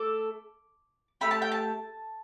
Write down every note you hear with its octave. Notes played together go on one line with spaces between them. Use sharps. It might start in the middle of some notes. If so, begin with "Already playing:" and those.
Already playing: A3 A4 D6
A3 G4 B5
A5
G5
A5